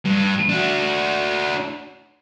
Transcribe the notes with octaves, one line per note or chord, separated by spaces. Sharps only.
G2
D4 F#4